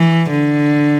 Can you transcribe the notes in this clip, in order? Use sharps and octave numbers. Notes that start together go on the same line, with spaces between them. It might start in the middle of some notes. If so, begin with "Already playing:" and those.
Already playing: E3
D3